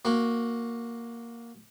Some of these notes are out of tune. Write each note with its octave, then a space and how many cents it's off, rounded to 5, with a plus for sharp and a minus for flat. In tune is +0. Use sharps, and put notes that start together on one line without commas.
A#3 +0 F#4 -15